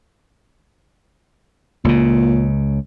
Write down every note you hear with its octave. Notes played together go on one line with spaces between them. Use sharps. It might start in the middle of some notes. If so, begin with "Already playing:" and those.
C#2 A#2 C#3